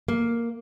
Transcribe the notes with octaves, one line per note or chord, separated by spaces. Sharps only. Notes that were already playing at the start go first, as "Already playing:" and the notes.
A#3